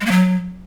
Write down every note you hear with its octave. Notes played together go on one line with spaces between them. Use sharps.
G#3
A#3
F#3